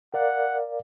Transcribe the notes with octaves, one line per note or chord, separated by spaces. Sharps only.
A#4 D5 F5 F#5